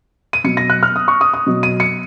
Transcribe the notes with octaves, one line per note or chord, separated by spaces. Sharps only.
D#7
B2 F#3 C#7
A#6
F#6
F6
D#6
C#6
D#6
D#6
B2 F#3
D#7
C#7